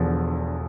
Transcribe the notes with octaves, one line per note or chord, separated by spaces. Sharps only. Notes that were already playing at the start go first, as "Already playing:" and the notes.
Already playing: E1 E2 D3 F3